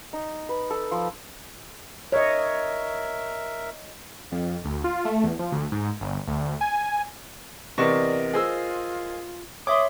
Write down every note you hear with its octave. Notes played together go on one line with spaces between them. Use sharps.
D#4
B4
A4
F3
A#4 C#5 D#5 E5
F2
D2
F4
A3
E2
F3
D2
G#2
G1
D2
G#5
E2 C3 A#4 D5 D#5 C#6 A#6
F4 G#4 C5 E6
C#5 E5 C6 D6 D#6